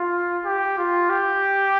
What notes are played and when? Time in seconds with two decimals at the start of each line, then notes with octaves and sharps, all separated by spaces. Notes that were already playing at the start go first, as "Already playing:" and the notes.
Already playing: F4
0.45 G4
0.78 F4
1.10 G4